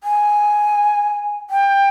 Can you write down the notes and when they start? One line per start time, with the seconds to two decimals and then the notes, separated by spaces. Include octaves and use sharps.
0.04 G#5
1.50 G5